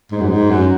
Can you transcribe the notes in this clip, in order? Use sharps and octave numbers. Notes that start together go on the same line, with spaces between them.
G#2
F#2
G#2
F#2